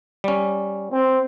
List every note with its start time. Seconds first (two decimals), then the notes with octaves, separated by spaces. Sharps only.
0.24 G3 C#4
0.92 C4